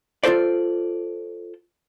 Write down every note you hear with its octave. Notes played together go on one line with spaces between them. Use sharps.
F4 F#4 A4 C5 D5